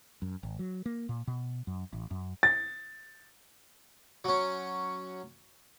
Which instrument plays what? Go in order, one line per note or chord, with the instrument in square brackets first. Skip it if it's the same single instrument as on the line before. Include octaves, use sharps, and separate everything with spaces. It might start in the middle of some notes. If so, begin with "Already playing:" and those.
[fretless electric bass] F#2
G#1
F#3
A#3
A#2
B2
F#2
A1
F#2
[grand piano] A6
[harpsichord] F#3 C#4